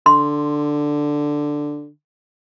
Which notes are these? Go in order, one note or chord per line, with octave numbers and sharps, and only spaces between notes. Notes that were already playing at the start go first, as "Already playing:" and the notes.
D3 C6